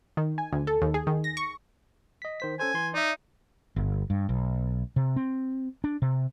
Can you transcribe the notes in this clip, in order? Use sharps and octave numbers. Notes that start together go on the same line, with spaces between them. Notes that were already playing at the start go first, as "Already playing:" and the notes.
D#3
G#5
D2
A4
D#2
G#4
D#3
A#6
C#6
D#5 B6
D#3 C5 B6
C#4 A4 C5 G#5
E3 C6
D#4 D5 E5
G1
G2
B1
C3
C4
D4
C3